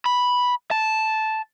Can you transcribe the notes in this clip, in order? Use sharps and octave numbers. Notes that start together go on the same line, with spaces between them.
B5
A5